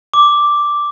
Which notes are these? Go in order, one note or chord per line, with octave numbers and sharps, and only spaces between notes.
D6